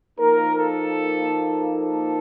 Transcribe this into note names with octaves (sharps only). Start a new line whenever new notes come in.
F3 A#3 D#4 A#4
A4
A4